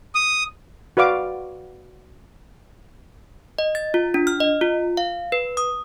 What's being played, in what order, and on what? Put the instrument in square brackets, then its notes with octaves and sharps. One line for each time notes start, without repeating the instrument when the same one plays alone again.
[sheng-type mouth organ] D#6
[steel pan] F#4 B4 D5 F5 D6
[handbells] D#5
A6
F4
D4
F6
D#5
F4
F5
B4
D#6